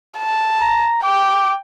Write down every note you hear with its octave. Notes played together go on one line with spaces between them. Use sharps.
A5
A#5
G5 D6